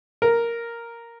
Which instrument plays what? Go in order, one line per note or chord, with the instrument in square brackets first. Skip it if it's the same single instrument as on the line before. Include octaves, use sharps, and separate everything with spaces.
[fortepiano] A#4